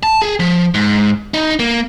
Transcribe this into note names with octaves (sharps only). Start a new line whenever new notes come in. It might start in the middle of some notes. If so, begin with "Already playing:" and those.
A5
G#4
F3
G#2
D#4
A#3